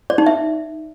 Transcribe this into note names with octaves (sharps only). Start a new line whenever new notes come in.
D5
D#4
E5